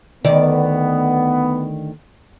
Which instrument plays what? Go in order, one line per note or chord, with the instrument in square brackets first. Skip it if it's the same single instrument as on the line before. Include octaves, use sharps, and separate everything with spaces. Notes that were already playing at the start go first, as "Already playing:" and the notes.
[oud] D2 D#3 D5 [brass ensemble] B3